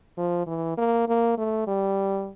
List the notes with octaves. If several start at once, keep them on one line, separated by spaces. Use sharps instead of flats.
F3
E3
A#3
A#3
A3
G3